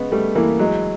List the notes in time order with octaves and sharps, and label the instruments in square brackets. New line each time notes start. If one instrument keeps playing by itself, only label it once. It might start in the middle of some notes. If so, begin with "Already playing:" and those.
Already playing: [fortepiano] C#3 B3 [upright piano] G#3
[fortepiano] G3 [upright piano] A3
[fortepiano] E3 [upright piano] A#3
[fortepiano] F#3 [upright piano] G#3